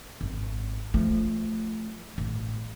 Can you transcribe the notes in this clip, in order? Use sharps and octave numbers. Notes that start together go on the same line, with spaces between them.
G#1
F3 A3
A1